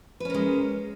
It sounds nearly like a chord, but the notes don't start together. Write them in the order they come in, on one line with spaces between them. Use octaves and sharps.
B4 C#4 A#3 G#3